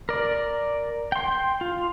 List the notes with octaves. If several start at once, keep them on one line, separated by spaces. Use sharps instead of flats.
A#4 D5
G5 C6
F4